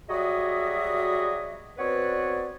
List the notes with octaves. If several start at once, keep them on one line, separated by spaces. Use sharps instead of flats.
F#3 G3 F#4 G#4 D#5 E5
B3 C4 F#4 B4 C#5 D5